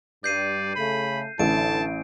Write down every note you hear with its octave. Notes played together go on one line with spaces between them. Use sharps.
G2 D5 G6 C7 D#7
C#3 A3 B5
A1 A2 D3 E3 A5 D7